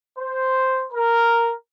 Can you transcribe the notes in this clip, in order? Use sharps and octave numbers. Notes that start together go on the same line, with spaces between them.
C5
A#4